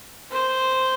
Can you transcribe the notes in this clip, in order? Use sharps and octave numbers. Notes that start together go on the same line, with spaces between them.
C5